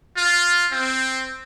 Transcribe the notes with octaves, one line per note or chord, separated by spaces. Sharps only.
F4
C4